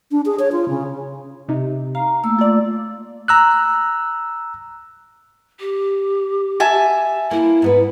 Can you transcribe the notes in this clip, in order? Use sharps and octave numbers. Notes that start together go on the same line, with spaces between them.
D4
G#4
C#5
F4
C#3
C3 D#4
F5 A#5
A3 A#3 E6
F4 D5
A#5 E6 F#6
G4
E5 G#5 A5
A#3 E4
G#2 B3 B4